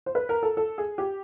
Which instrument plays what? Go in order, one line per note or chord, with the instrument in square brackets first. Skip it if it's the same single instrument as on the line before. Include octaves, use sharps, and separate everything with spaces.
[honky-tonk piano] C5
B4
A#4
A4
A4
G#4
G4